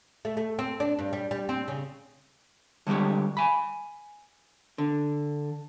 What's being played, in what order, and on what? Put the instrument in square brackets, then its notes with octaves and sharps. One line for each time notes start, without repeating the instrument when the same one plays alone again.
[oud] A3
A3
C4
D4
G2
G3
G3
C4
C#3
[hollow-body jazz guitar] D3 G3 G#3 G4 C#5
G#5 B5
D3